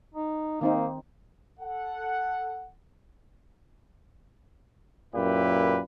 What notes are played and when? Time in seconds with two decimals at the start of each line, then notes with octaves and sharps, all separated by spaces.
0.14 D#4
0.61 D#3 A#3 C4 D#4
1.60 A4 F#5
5.15 F#2 A#2 E4 G4 B4